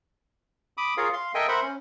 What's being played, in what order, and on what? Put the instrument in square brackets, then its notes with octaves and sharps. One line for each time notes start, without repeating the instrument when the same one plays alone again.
[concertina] B5 D6 D#6
F4 G#4 A#4 C#5 F5
F5 C6
A4 A#4 D#5 E5 G5 G#5
A#4 C5 E5 F#5 B5 C6
C#4